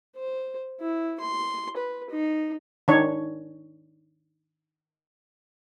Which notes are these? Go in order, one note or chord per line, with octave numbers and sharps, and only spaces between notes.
C5
E4
C6
B4
D#4
D#3 D4 C#5